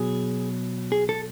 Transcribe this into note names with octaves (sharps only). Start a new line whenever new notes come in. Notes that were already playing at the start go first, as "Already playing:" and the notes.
Already playing: B2 F#3 G#4
G#4
A4